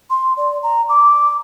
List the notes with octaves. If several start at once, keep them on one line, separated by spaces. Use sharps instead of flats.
C6
D5
A#5
D6